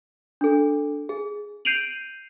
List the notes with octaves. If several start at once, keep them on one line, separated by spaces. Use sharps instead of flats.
D4 A4
G#4
G6 C7 D7 D#7 F7 F#7